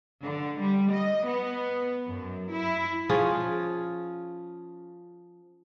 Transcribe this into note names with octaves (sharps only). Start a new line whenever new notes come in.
D3
G3
D#5
B3
F#2
E4
F3 C#4 F4 G#4